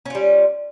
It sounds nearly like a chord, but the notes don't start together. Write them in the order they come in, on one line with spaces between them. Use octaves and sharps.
C#4 F4 G3